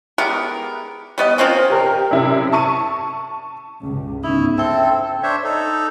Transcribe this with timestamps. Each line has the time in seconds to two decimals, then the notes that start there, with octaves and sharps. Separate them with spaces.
0.18 G#3 B3 G4 A#4
1.18 G3 B3 D#5
1.38 F3 A#3 C4 C#4
1.70 G4 A#4
2.11 F#2 C3 E4
2.52 A5 C#6 D#7
3.83 C#2 G2
4.24 D2 G#2 C#3 B3 C#4 D#4 E4
4.58 C4 A4 E5 G5
5.23 D4 C5 C#5 E5
5.44 D#4 A4